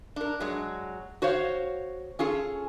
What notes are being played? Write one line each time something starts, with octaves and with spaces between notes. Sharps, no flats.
D4 A#4
F#3 G#3
F#4 C5 C#5 F5
C#4 F4 G#4 A4